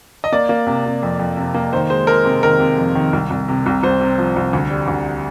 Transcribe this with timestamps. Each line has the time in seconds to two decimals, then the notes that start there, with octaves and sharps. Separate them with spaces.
0.24 D#5
0.32 A#3 D5
0.49 A#3
0.66 C3
0.85 C3
1.03 F2
1.19 F2
1.37 C3
1.54 A#3
1.73 D#3 C5
1.90 G#3 C5
2.07 G#3 A#4
2.25 C3
2.43 D#3 A#4
2.60 C3
2.78 F2
2.95 D#3
3.13 C2
3.30 C2
3.48 C3
3.66 C2
3.83 C2 C5
4.01 C3
4.18 F3
4.36 C2
4.53 D2
4.70 G3
4.88 D2